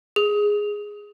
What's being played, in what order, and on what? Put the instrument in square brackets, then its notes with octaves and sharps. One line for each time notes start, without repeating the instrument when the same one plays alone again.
[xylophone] G#4